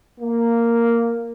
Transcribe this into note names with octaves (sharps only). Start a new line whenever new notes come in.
A#3